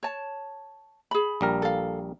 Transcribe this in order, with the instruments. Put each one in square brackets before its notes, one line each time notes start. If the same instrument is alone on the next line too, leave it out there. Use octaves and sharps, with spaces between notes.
[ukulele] C#5 A5
G#4 B5
[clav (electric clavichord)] A#1 G3 A#4
[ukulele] A4 F5